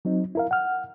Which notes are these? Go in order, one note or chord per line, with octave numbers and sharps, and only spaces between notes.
F#3 C4 D#4
E4 A#4 F5
F#5 F6